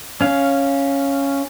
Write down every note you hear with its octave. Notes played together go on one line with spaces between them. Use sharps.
C#4 F5